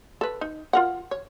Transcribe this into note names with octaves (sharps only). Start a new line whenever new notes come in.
A4 B4
D#4
F4 A#4 F#5
C#5